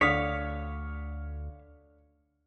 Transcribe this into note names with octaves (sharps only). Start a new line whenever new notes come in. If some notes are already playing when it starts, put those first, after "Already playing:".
D2 D3 C#5 F5 D#6 B6